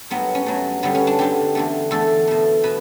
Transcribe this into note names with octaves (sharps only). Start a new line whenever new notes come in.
G2 F#3 A3 B3
C#4
G2 F#3 A3
G2 D3 G3 B3
C#4
D4
G2 D3 G3 G4
E2 D3 A3
E2 D3 A3 A4
B2 A3
B2 B4